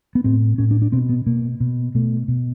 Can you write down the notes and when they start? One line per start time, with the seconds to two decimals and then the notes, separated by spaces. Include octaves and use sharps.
0.15 B3
0.24 A2 C4
0.58 A2 C#4
0.71 D4
0.82 D4
0.92 B2 C4
1.09 B3
1.26 B2 A#3
1.60 B2
1.95 B2 A3
2.28 B2